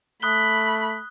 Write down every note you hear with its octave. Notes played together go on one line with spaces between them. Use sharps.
A3 B5 D#6 F#6 G7